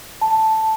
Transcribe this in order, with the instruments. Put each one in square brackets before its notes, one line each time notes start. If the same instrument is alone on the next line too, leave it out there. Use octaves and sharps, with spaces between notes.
[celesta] A5